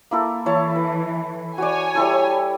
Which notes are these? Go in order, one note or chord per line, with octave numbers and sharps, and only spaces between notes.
A#3 E4 A4
E3 E4 C#5 A5
B4
F#4 C#5 D5 G#5
G3 E4 A4